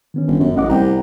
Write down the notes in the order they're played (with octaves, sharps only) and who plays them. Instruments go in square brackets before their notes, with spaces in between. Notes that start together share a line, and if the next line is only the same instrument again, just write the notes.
[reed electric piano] D#3 B3 C#4
[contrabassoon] G1
F#2
[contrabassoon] A1 [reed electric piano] D#5 F#5 D6
[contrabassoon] C2 [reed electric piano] F#5 G5 A#5